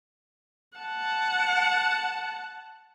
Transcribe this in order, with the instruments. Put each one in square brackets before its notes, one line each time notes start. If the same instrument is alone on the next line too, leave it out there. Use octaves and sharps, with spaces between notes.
[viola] F#5 A5